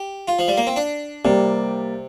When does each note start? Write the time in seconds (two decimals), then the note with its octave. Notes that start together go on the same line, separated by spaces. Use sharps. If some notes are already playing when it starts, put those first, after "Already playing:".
Already playing: G4
0.28 F4
0.39 F3
0.48 G3
0.57 A#3
0.67 C4
0.76 D4
1.25 C3 G3 A#3 G4 D5